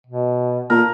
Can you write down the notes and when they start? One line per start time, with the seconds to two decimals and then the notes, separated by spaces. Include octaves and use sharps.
0.07 B2
0.70 A#2 A#4